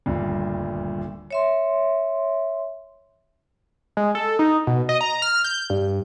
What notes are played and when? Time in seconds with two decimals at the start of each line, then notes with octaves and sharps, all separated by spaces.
0.06 D#1 D2 G2
1.31 C#5 E5 C6
3.97 G#3
4.15 A4
4.39 D#4
4.67 B2
4.89 D#5
5.01 A#5
5.22 F6
5.44 G6
5.70 G2